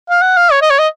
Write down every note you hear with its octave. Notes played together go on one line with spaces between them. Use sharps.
F5
F#5
F5
C#5
D#5
C#5
D#5